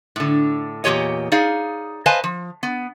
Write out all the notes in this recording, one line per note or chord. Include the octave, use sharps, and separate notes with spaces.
A2 D3
E2 A#2 F3 G4 C#5 D#5
D#4 G#4 D5 F5
B4 C5 D#5 F5 G#5 A5
F3
B3